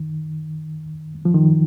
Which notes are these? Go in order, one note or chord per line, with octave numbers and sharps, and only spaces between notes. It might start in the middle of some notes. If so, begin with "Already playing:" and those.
Already playing: D#3
F3
D#3